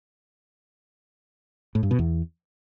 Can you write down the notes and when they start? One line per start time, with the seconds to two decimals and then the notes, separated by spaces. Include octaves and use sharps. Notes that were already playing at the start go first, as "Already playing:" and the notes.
1.75 A2
1.83 G2
1.91 B2
1.99 E2